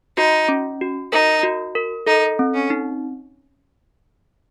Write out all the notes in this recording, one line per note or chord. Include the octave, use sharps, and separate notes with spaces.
D#4 F#4
C#4
F#4
D#4 A#4
F#4
A#4
D#4 A4
C4
C#4
D#4